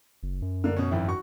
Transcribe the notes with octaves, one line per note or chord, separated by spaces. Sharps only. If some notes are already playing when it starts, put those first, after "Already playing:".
F#1
F#2
D3 A#3
B2 C#4
G#1 F2 E4
F#4 C#6